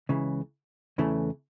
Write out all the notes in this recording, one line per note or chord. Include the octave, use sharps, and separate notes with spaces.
C#2 C#3 E3
E2 C#3 E3 A3